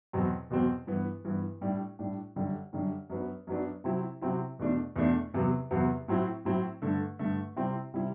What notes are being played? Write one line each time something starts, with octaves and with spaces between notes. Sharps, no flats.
E2 B2 F#3 C4
E2 B2 F#3 C4
G2 E3 B3
G2 E3 B3
A2 G3 D4
A2 G3 D4
F#2 D3 G3 D4
F#2 D3 G3 D4
F#2 F#3 B3 D4
F#2 F#3 B3 D4
C3 F#3 C4 E4
C3 F#3 C4 E4
E2 B2 A3 D4
E2 B2 A3 D4
E2 C3 F#3 B3
E2 C3 F#3 B3
A2 F#3 C4 E4
A2 F#3 C4 E4
G2 D3 A3
G2 D3 A3
C3 G3 C4 E4
C3 G3 C4 E4